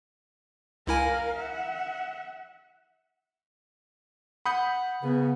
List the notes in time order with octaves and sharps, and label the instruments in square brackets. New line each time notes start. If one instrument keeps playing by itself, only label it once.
[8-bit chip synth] C#2 E4 G#5 [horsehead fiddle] A#4 F5
[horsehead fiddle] E5 F#5
[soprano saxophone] F#5 [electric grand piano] B5 D#6 G6
[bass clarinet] C#3 [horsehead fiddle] B3